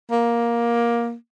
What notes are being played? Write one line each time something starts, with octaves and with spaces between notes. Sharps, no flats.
A#3